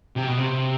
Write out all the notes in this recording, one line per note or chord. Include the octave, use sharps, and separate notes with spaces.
C3
B2
C3